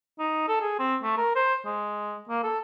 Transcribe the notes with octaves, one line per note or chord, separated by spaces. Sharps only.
D#4
A4
G#4
C4
A3
A#4
C5
G#3
A#3
A4